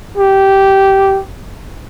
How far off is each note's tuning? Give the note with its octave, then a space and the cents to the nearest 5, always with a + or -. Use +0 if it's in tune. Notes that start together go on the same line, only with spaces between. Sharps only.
G4 -10